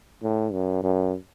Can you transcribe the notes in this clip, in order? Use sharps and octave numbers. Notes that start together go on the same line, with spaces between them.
A2
F#2
F#2